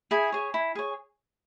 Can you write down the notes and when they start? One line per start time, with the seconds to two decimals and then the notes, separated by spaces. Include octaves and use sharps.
0.11 E4 G#4 G#5
0.32 G#4 C#5
0.54 E4
0.75 G#4 C#5